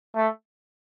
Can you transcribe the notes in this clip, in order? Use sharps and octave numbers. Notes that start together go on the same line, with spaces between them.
A3